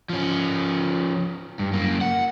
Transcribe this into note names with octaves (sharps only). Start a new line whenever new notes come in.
F3 C#4
G2
F#2 A#3
F#5